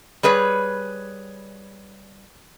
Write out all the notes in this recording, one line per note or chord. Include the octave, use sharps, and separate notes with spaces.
G3 G#4 B4 C#5